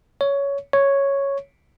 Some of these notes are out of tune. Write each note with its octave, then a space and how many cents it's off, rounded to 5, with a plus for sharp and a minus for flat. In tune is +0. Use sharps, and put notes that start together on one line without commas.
C#5 +15
C#5 +0